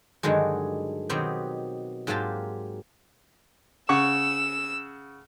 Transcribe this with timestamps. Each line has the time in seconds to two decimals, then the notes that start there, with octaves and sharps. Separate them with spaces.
0.23 G2 D3 D#3 F#3 G#3
1.09 B2 D#3 F#3 B3 C4 G4
2.07 G#2 F#3 A#3 F4 G4 A5
3.89 C#3 F#5 C#6 E6